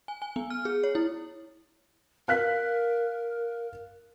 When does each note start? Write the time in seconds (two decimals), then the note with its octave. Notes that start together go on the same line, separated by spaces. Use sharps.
0.08 G#5
0.22 G#5
0.36 B3
0.50 F6
0.65 G#4
0.84 C#5
0.95 E4
2.28 A#4 F5 F#6 B6